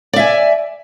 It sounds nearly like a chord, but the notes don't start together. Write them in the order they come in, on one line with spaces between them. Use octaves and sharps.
D5 E5 G#5